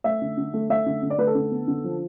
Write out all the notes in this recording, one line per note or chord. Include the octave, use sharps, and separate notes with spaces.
A3 E5
D3
D3
A3
A3 E5
D3
D3
D5
A3 B4
A4
D3
B3
D3
F3